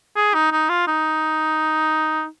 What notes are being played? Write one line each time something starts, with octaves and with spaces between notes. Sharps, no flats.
G#4
D#4
D#4
F4
D#4